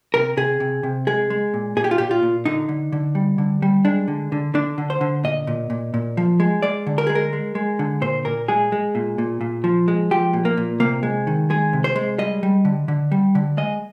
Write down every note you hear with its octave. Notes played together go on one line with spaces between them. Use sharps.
C3 A#4
C3 G#4
C3
C3
G#3 G#4
G#3
A#2
A#2 G#4
G4
F4
A#2 G4
F4
A#2
D3 D#4
D3
D3
G3
D3
G3
G#3 D4
D3
D3
D3 D4
D3
C5
D3
A#2 D#5
A#2
A#2
A#2
F3
G#3
G#3 D5
D3
A#4
G#3 G#4
A#4
G#3
G#3
D3
A#2 C5
A#2 A#4
G#3 G#4
G#3
A#2
A#2
A#2
F3
G#3
F3 G4
A#2
A#3
A#2
C3 A#3
G#3
D#3
G#3 G#4
C3
C5
G#3
G3 D#5
G3
D3
D3
G3
D3
G#3 D#5